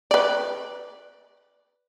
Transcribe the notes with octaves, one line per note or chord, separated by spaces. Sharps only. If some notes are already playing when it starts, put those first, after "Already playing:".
B4 D5